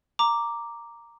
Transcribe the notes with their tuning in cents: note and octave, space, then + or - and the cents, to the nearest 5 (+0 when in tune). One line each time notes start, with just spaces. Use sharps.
A#5 +0 D6 +0